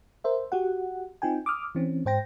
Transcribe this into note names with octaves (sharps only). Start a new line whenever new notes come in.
A#4 C5 E5
F#4 G4 F#5
C4 D#4 F4 G5 G#5
D6 D#6 F6
E3 C4 C#4
G#2 C5 G5 A#6